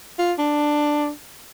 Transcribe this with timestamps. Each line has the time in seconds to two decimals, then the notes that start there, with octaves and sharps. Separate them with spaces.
0.19 F4
0.39 D4